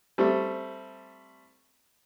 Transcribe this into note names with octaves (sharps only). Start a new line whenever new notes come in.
G3 A3 C4